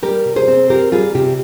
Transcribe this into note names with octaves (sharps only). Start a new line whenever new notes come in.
G3 G4 A#4
C3
G#4 C5
C4
F4 G4 A#4
G3 F4 G#4
C3 G4